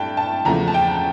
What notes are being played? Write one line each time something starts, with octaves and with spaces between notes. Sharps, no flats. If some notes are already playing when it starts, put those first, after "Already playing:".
Already playing: G2 A3 G5 A5
A5
E2 C#3 F3 A3 A#5
A5
G5